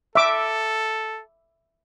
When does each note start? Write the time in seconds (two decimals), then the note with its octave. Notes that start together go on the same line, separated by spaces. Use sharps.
0.15 A4 E5 D6